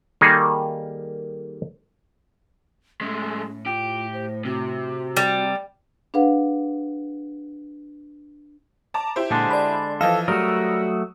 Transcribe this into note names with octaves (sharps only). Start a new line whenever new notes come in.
D#3 G3 A#3 D#4 G#4 A4
A2 G#3 A3 C#4
F4 G4
C5
C3 F#4
G3
D4 G#4 B4 F5 F#5
A5 A#5 D6
E4 G4 C5
A#2 D3 G#3 D4
D5 B5
E3 F3 A4 D#5 F5
F#3 G3 A3 F#4 A#4 D#6 E6